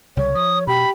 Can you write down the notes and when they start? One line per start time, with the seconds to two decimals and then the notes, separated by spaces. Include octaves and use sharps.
0.17 C2 C#3 G3 C#5
0.35 F3 D#6
0.67 B2 G4 B5